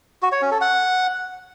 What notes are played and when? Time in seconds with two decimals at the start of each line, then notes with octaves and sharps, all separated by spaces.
0.23 F#4
0.32 C#5
0.42 C#4
0.51 A4
0.61 F#5